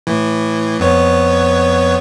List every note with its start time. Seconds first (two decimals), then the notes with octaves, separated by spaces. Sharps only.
0.07 A2 E3
0.80 F2 B3 C#5